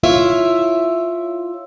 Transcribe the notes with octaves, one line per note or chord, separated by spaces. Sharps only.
E4 F4 C#5 E5